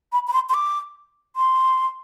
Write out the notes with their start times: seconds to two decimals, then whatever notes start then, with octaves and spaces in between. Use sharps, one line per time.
0.13 B5
0.27 B5
0.33 C6
0.49 C6
0.54 D6
1.36 C6